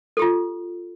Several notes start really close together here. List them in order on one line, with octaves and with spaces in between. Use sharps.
A4 G4 F4